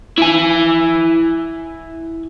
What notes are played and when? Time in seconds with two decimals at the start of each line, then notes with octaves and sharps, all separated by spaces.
0.18 E4 G#5